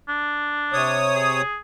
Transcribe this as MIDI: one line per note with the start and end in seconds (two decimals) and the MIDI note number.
0.09 1.07 62
0.73 1.42 48
0.73 1.42 73
0.73 1.42 87
1.15 1.58 68